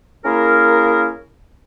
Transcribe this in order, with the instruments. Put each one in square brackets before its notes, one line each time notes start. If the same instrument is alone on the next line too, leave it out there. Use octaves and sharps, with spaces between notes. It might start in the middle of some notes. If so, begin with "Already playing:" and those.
[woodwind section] A#3 C#4 E4 G#4 A#4